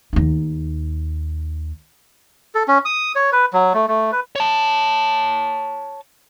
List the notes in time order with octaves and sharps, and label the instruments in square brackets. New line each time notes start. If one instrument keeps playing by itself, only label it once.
[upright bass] D#2 D#4
[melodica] A4
C#4
D#6
C#5
B4
F#3
A3
A3
B4
[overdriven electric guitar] C#5 A5